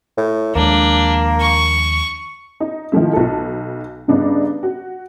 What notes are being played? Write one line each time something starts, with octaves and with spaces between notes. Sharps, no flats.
A2
D#2 F3 G#3 A#3 D4
C#6
D#4
D#3 F3 A3 E4
B1 A4
G2 C#3 B3 D4 D#4
F#4